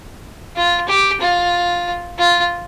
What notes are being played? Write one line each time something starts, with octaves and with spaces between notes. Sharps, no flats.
F4
G4
F4
F4